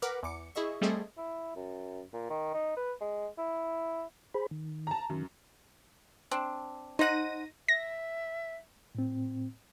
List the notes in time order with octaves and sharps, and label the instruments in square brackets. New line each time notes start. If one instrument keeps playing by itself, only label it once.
[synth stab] A#4 B4 F#5 D6 F6
E2 D6 C#7
E4 G#4 D#5 E5 C#6
G3 A3 C4 G#4 A4 D#5
[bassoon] E4
F#2
A#2
D#3
D#4
B4
G#3
E4
[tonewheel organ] G#4 C5 B5
D#3
[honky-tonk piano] A5 A#5
[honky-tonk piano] F#2 [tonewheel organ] D#3
[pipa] C4 D4
[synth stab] D#4 A#6 D#7 [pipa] C5 F#5
[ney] E5 [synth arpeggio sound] A#6
[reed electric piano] A2 C4